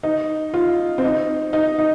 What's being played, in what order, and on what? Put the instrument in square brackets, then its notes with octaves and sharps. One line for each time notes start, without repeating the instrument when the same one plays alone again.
[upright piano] D#4
F4
C4
D#4
D#4
D#4